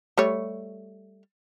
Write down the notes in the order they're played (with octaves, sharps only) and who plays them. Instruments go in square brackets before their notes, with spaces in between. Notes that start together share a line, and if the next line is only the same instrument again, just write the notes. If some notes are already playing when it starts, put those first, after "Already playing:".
[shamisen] G3 A3 C#5